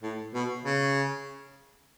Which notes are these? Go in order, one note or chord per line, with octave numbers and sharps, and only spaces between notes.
A2
B2
C#3